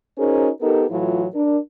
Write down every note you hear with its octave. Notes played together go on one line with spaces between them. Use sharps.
C#4 D#4 F#4 G#4 A#4 C5
B3 D#4 G4 A4 A#4
A2 E3 F#3 E4 F4
D4 A#4